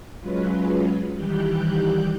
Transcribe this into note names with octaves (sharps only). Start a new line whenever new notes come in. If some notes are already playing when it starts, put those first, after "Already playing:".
F#3 G#3 C#4 F4 B4
D#3 E3 G3 G4 F#6 G6